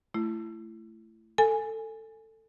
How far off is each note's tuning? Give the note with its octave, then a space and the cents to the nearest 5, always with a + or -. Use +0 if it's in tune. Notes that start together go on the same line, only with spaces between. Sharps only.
A3 +0 E4 +25
A4 +15 G#5 +0